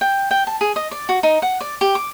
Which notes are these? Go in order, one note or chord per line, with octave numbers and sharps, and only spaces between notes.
G5
G5
A5
G#4
D#5
D5
F#4
D#4
F#5
D5
G4
D6